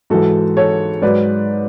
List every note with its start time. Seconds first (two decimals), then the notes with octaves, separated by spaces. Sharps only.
0.10 G#2 E3 F#4 A4
0.57 A4 C#5
1.02 G#2 F#3 B4 D5